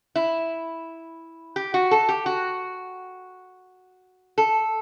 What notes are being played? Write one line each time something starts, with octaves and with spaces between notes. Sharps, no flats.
E4
G4
F#4
A4
G4
F#4
A4